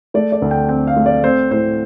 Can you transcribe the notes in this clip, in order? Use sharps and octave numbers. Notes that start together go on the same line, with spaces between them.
A3 D5
D5
D2
G5
C4 G5
F5
A3
D5
C4 C5
A2 C5